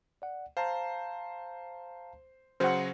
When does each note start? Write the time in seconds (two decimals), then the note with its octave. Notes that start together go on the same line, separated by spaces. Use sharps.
0.22 D5 F#5
0.57 C5 F5 A5 A#5
2.60 C#3 F#3 F#4 C5 F#5